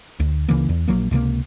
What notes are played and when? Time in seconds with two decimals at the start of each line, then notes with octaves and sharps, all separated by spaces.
0.20 D2
0.49 C#2 C#3 E3 A#3
0.69 E2
0.88 A#1 F2 F#3 A#3
1.11 C#2 C3 G#3 A#3